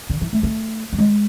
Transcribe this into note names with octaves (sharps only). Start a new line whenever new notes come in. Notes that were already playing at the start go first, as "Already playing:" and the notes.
D3
E3
A3
A3
F#3
G#3